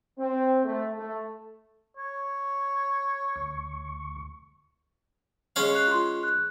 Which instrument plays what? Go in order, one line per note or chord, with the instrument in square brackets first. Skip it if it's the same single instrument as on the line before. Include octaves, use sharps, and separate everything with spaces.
[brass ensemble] C4
A3
A3
[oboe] C#5
[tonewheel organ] D2 C#6
[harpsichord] G#3 C#4 F5
[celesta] F#6 C7 F7
F4 C6
F#6